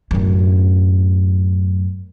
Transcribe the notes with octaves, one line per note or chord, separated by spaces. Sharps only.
F#2 A2